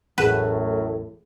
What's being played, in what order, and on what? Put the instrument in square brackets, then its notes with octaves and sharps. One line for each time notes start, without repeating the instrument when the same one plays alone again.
[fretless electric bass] E1 A1 [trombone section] F#2 A2 [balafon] G#4 F#5 [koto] B4